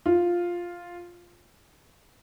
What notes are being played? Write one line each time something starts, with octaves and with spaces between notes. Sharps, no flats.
F4